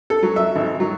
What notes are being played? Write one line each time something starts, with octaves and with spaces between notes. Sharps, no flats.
A4
F#3
E5
G#1
F#3